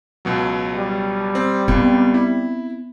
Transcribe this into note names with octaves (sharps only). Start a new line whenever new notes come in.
C#2 B2 F#3
G3
C4
C#2 B3 C4
E4